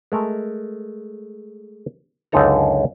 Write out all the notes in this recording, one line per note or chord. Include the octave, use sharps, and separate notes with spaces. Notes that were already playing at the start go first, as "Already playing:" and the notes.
G#3 A3 A#4
C#2 F#2 D3 D#4 A4 A#5